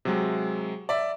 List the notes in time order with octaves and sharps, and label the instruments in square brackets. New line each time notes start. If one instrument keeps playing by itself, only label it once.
[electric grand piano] C3 F#3 G#3
[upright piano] D5 E5